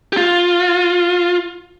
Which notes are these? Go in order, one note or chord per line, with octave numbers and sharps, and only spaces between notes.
G4
F4